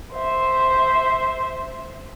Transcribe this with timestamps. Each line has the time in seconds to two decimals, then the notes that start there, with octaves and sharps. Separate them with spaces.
0.13 C5 E5